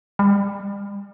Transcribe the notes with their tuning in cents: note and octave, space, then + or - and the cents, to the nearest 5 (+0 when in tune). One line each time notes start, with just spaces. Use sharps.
G3 +35